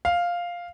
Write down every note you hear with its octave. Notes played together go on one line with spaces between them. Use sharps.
F5